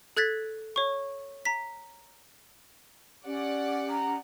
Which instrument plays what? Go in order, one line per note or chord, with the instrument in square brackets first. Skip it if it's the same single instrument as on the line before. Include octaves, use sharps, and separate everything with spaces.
[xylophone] A4 F#6 G#6 A6 B6
C#5 C#6
A#5 B6
[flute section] C#4 G4 [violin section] D5 F#5
[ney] A#5